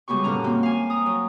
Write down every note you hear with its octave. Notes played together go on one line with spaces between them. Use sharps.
C#3 G3 G#3 B3 F#4 C#6
F#2 A#2 D3 C#4 A#5 F6
A#3 C4 F#4
F5 G#5
A#5 D#6
F#3